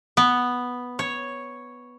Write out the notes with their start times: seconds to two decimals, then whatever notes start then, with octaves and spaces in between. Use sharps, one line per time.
0.17 B3
0.99 C#5